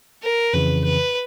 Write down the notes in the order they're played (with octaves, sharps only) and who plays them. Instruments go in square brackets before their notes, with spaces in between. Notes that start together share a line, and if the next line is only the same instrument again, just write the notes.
[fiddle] A#4
[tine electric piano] F2 C#3 E3 [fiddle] B4
[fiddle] B4